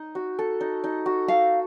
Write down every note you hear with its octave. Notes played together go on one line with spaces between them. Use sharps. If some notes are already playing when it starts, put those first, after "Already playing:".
Already playing: D#4
F#4
A4
D#4
D#4
F#4
A4 F5